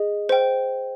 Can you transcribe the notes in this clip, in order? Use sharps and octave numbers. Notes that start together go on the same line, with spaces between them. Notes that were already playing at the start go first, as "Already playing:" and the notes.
Already playing: G#4 D#5
C5 G5